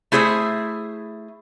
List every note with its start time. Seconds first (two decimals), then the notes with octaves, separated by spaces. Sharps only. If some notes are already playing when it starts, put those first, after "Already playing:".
0.12 A3 E4 G#4 C5 E5